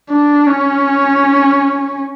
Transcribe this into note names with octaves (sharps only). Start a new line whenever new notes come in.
D4
C#4